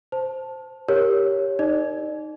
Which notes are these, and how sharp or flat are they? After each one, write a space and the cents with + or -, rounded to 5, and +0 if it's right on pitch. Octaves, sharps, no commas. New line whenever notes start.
C5 +0 A5 +0
G4 +10 A#4 +0 C#5 +0
D#4 +0 D5 +40